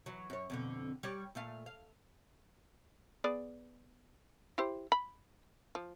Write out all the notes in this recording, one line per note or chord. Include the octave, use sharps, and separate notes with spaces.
E3 F#3
F#2 C#5
F2 B2 D3
G3 C#5 D5
A#2 A3 F5
F5
B3 G#4 D5
E4 G4 C5
B5
F3